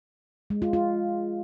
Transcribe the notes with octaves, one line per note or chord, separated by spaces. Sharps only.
G#3
F4
F4